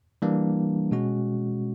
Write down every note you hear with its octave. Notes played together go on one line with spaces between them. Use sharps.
E3 G3 A#3 D4
B2 G#3 C#4 F#4